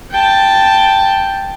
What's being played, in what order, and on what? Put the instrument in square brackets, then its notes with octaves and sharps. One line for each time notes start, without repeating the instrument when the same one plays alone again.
[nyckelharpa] G5 A5